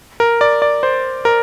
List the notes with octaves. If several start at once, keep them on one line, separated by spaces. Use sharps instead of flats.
A#4
D5
D5
C5
A#4